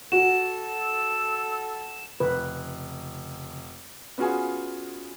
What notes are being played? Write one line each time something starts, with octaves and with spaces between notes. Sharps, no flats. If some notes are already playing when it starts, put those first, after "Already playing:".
F#4 A4 E7
E6
F1 C#3 B4
B3 C#4 F4 F#4 G#4 G#5